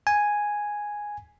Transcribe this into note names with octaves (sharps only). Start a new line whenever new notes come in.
G#5